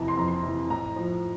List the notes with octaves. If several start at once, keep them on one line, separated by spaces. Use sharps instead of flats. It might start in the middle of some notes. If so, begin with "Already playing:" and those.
Already playing: F2 C3 E3 A5 A#5
C6
F2 A#5
C6
C3 E3
A2 A#5
F3